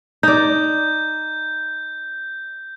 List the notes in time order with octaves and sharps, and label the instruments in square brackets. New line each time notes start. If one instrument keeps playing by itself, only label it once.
[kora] D#4 D5 [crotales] G6